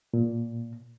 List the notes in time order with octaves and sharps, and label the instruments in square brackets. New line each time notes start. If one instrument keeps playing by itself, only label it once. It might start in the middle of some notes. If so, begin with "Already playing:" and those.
[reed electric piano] A#2